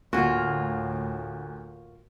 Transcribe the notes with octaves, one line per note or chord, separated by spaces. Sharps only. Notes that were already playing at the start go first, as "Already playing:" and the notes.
D2 A2 A#3 F4 F#4